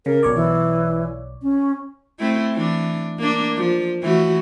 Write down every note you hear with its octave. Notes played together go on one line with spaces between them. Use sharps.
C#3 A#4
B1 C#5 D5
E3
C#4
A3 C4 E4
E3 D4
A#3 D4
F3
E3 A3 F#4